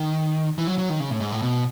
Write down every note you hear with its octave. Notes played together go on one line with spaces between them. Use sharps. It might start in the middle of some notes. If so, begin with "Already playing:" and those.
Already playing: D#3
E3
F#3
F#3
D#3
C#3
A2
G#2
A2
B2